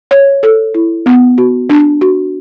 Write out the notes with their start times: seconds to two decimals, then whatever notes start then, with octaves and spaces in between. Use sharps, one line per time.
0.11 C#5
0.43 A4
0.75 E4
1.06 B3
1.38 F#4
1.70 D4
2.01 F#4